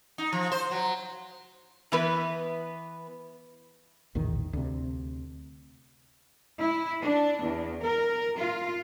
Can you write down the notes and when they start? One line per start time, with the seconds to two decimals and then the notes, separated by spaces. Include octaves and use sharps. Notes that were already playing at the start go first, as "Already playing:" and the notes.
0.18 D#4
0.33 F3
0.52 C5
0.71 F#3
1.92 E3 B3 B4
4.15 A#1 E2 A2 D#3
4.53 D2 C3
6.60 E4
7.00 D4
7.42 E2
7.82 A#4
8.37 F4